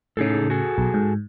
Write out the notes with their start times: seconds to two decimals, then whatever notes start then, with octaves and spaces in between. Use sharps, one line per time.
0.17 A2 C#3 D#4 G#4 A4
0.50 F#4 G#4 A4
0.78 B1
0.94 G#2